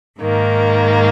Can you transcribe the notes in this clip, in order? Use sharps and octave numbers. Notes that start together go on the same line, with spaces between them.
G#2 D#3 A#3